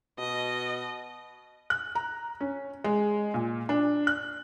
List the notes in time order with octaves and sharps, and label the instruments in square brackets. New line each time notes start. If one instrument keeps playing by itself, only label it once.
[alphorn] B2 [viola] D#5
[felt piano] F#6
A#5
C#4
G#3
A#2
D4
F#6